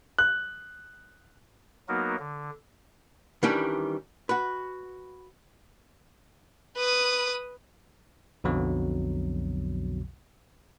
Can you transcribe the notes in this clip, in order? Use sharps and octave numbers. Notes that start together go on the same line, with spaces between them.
F#6
F#3 A#3 B3 D#4 F#4 A#4
D3
D#3 E3 G3 C#4 D4
F#4 B4
B4 D#6
B1 F2 B2 D3 F#3